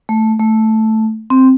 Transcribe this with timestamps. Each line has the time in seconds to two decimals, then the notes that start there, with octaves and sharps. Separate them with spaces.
0.09 A3
0.39 A3
1.30 C4